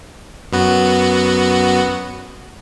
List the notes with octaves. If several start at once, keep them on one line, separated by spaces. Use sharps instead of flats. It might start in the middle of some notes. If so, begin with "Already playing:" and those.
F#2 B3 F#4